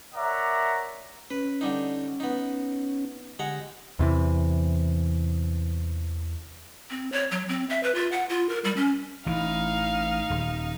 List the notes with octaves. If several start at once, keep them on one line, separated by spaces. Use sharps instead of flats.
A#4 C#5 D5 E5 F#5 A#5
C#4 B4
D3 G3 D#4
B3 D#4
D3 G#3 G4 F#5 A#5
E2 C3 E3
C4
C#5
F#3
C4
E5
B4
F4
F#5
F4
A#4
G3
C#4
A1 E3 D#4 F5
D#1